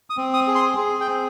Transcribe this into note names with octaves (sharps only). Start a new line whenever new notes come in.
D#6
C4
D#6
G#4
C6
G#4
G5
C4